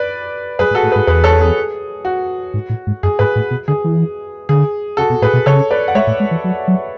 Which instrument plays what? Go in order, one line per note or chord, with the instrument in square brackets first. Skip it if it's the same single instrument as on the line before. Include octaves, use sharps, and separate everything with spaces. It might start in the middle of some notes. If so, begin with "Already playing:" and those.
Already playing: [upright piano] B4 D5
[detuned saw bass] F#2 [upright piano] G#4 B4
[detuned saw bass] G#2
[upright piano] F#4 A4
[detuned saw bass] A2
[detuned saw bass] G#2 [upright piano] G#4 B4
[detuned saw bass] E2 [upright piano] G#4 B4
[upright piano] A4 C#5
G#4
F#4
[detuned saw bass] G#2
A2
G#2
[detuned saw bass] F#2 [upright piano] G#4
[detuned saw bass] G#2 [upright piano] G#4 B4
[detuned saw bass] A2
B2
[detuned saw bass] D3 [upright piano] G#4
[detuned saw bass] E3
[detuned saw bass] D3 [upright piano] G#4
[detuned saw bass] C#3 [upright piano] F#4 A4
[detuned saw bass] B2
[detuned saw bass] A2 [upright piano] G#4 B4
[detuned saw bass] B2
[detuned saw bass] C#3 [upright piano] A4 C#5
[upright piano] B4 D5
F#5
[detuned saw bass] G#3 [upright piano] C#5 E5
[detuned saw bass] A2
G#3
E3
F#3
F#3